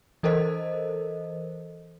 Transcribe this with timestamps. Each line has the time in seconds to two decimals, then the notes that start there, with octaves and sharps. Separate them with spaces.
0.23 E3 A4 A#4 C5 D#5